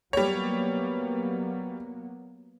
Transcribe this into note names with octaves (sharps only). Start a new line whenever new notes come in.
F#3 G3 A#3 B3 C#5